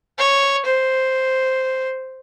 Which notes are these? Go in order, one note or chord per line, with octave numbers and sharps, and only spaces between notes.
C#5
C5